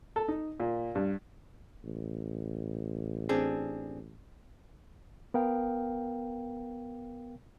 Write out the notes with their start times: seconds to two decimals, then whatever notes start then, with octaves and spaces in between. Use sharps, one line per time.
0.16 A4
0.28 D#4
0.60 A#2
0.95 G2
1.84 A1
3.29 C4 D4 G#4
5.34 B3 A#4 F5 G5